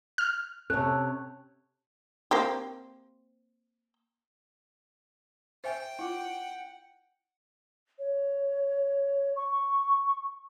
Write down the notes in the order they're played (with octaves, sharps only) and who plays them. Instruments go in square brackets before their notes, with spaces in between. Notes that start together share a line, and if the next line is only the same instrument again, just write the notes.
[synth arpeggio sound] F6
[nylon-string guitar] C3 C#4 [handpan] A4 C#5 [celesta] F#6
[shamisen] A#3 C4 G4
[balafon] C5 E5 G#5 [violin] G5
[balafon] E4 F4 [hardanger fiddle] F#5
[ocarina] C#5
C#6